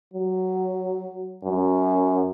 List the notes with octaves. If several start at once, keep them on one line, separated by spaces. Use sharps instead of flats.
F#3
F#2